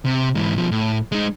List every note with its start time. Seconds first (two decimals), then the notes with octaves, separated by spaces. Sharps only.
0.05 C3
0.35 G#2 E3
0.56 B2 F3
0.71 A2
1.12 G#3 D#4